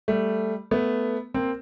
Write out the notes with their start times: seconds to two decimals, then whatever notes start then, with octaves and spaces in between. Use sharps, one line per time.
0.08 G3 A3
0.71 A3 B3
1.34 A#3 C4